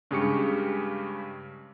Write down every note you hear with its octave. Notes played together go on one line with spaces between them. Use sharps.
G2 C#3 G#3 G4 C#6 C#7